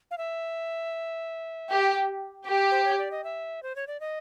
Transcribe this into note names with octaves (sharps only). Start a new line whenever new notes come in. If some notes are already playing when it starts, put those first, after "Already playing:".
F5
E5
G4
G4
C5
C#5
D5
D#5
E5
C5
C#5
D5
D#5